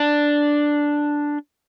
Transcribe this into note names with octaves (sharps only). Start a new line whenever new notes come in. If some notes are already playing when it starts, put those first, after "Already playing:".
Already playing: D4